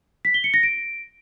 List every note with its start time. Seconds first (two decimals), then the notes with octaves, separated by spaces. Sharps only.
0.25 B6
0.34 G7
0.44 C#7
0.54 A#6
0.63 D7